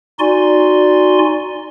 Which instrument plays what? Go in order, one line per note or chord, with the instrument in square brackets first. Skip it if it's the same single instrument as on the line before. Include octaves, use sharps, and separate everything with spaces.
[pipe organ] D#4 F#4 D5 G#5 C6